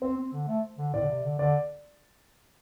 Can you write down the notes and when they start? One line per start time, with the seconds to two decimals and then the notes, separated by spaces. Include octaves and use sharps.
0.02 C4 C5
0.17 C4
0.33 D3
0.48 A3
0.78 D3
0.93 A2 D5
1.01 D3
1.09 C3
1.24 D3
1.39 D3 D5